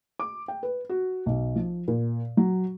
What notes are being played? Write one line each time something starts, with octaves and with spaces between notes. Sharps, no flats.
D6
G5
B4
F#4
B1
F3
A#2
F#3